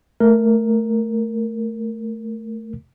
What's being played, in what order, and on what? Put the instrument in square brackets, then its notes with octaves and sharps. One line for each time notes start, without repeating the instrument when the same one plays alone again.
[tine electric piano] A3 A#4